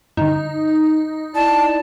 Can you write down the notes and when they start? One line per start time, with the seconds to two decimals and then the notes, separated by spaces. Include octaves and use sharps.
0.17 G2 D3 D#4
1.35 E4 D5 A5